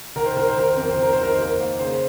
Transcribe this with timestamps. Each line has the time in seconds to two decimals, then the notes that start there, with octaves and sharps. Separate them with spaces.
0.16 D#3 A#4
0.26 C5
0.36 D#3 A#4
0.48 C5
0.57 D#3 A#4
0.70 C5
0.77 F2 A#4
0.91 C5
0.97 D#3 A#4
1.13 D#4 C5
1.23 A#4
1.34 D#2 C5
1.45 A#4
1.59 A#3
1.79 C#3 C5